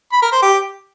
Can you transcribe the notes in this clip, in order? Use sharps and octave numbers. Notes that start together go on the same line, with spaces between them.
B5
A#4
C5
G4